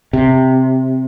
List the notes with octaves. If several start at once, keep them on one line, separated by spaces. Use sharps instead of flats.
C3